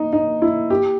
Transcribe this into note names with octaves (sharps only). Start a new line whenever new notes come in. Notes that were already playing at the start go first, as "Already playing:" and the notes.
Already playing: D#4
D#4
E4
G4